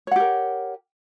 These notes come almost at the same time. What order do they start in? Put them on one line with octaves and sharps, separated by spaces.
C#5 F#5 G4 A#4